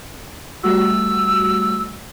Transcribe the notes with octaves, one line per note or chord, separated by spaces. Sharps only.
G3 A3 F#4 E6